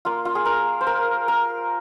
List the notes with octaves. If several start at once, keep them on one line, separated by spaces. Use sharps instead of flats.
A#3 F4
F4
G#4
A#4
C5
A#4
A#4